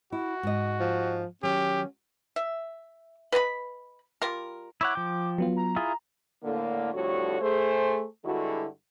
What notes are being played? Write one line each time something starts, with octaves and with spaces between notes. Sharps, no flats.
E4 F#4
G#2 D#5
F3
D#3 F#3 C#4 G4
E5
B4 D#5 A5 B5
G3 F4 A#4
E4 C#5 F#5 D6
F3 G5
F#3 B3 F4
A#5
E4 F4 G#4
A2 D3 A#3
F2 A2 D3 G3 F#4 C#5
A3 G#4 C5
G2 D3 G#3 E4 F#4